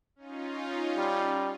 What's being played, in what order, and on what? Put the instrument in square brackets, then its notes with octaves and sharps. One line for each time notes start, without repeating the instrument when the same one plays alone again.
[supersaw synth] C#4 D#4 F4
[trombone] G3